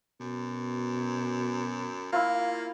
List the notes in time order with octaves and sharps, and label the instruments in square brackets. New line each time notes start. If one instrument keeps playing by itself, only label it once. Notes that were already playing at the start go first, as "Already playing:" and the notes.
[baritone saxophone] F#2 [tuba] B2
[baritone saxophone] A#3 [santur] E4 F4